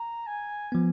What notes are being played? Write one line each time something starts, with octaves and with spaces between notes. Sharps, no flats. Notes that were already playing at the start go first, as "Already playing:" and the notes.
Already playing: A#5
G#5
F3 B3